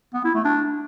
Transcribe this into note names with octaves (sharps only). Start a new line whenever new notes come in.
B3
E4
A3
D4